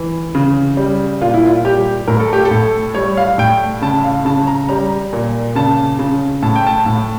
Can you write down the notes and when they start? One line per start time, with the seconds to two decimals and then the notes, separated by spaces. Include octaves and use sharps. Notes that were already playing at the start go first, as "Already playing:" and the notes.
Already playing: E3
0.35 C#3
0.77 G3
1.21 A#2 F4
1.34 E4
1.46 F4
1.65 G3 G4
2.08 A2 A#4
2.20 A4
2.33 G4
2.45 A4
2.51 A2
2.94 G3 C#5
3.17 F5
3.38 A2 G5
3.82 C#3 A5
4.04 F5
4.25 C#3 A5
4.47 A#5
4.69 G3 A#5
5.13 A#2
5.55 C#3 A5
5.99 C#3
6.42 A2 A5
6.56 G5
6.67 A5
6.86 A2